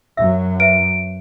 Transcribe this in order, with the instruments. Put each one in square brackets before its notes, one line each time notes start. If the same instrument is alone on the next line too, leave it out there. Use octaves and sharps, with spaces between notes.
[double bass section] F#2 F#3 [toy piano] E5 E6
[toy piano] B4 E5 [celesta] D7